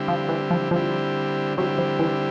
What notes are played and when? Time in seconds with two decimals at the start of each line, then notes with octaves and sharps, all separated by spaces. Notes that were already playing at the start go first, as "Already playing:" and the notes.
Already playing: D3 G3 C4 E4 G4
0.08 F3
0.29 E3
0.51 F3
0.71 D3 F3 G3 C4 E4 G4
1.57 D3 F#3 G3 C4 E4 G4
1.79 F3
1.99 E3